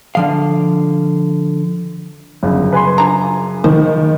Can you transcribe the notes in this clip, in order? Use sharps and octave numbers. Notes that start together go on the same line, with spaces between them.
D3 F3 F5
G1 F#2 C#3
B4 G#5 C6
F3 D4 A#5
D#3 C5